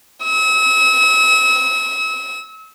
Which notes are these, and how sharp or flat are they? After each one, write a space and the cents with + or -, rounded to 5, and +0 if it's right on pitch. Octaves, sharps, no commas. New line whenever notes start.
E6 -40